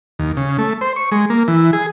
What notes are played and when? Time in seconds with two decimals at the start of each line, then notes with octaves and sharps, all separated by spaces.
0.19 D#2
0.37 C#3
0.59 A3
0.81 C5
0.96 C#6
1.12 G#3
1.30 A#3
1.48 E3
1.73 G#4